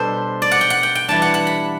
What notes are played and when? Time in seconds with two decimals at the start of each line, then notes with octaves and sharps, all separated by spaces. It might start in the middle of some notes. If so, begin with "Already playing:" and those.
Already playing: B2 G3 D4 A4 C5
0.42 D5
0.51 F#5
0.61 G5
0.70 F#5
0.83 G5
0.95 G5
1.08 E3 G3 D4 A5
1.22 F#5
1.34 F#5
1.47 B5